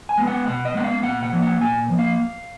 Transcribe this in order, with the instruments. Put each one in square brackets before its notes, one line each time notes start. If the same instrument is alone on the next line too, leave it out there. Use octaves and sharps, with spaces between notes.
[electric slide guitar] G#5
G#3 B3
F#5
B2 F#5
D#5
G#3 B3 F#5
F5
A#2 F#5
F#5
F3 A#3
F#5
A#2 G#5
F3 A#3
F5